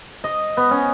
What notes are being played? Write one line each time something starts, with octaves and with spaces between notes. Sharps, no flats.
D#5
B3
C#4